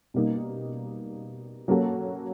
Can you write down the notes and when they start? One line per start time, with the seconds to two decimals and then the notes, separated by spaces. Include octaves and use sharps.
0.14 B2 G3 A#3 D#4
1.68 F#3 A#3 C#4 F#4 A4